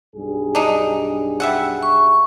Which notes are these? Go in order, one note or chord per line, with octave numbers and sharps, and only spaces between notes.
B1 G2 G#4
D4 D#4
G3 E5 F#5
C#6